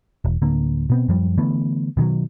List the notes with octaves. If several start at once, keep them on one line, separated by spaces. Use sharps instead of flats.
E1
D1 D3 A#3
B2 B3 C4
F#2 F3 G3
D3 E3 A3 B3
B2 D#3 F3 F#3